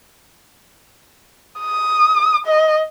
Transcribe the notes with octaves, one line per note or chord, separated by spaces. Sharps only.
D#6
D#5